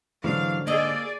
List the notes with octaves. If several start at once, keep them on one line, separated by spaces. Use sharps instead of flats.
G#2 D3 E3 F#3 D4 F5
A#3 D4 G#4 D5 D#5 E6